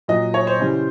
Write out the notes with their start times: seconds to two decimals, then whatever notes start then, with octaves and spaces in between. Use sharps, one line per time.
0.08 A#2 F#3 D#5
0.34 C#5
0.47 C5
0.60 C#3 E3 G3